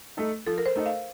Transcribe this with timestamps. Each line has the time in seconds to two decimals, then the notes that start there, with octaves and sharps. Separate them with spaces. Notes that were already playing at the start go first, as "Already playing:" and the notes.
0.17 A3 D#4 A4
0.46 F3 A4
0.58 A#4
0.66 C5
0.76 A3 D#4 A4
0.86 F5